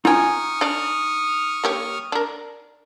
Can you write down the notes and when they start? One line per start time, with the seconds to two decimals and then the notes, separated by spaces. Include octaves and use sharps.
0.05 D#4 F4 G5 G#5 C#6 D#6 F6
0.61 D4 D5
1.64 A#3 G4 C#5
2.12 D4 A#4